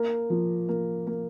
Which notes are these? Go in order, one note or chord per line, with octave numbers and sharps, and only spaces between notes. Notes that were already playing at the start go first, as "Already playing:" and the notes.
Already playing: A#3
F3
A#3
A#3